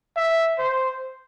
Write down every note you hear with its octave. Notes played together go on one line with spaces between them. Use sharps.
E5
C5